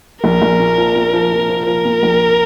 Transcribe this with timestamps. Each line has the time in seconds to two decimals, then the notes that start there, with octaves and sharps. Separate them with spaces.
0.24 A#1 A#4
0.42 A#1
0.60 A#2
0.78 F3
0.96 A#2
1.13 F3
1.32 F3
1.49 F3
1.67 F3 A#4
1.85 A#2
2.03 A#1